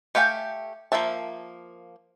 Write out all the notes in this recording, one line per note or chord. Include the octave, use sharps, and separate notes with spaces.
A3 G4 F5 G5 G#5
F3 A#3 A#4 E5 A5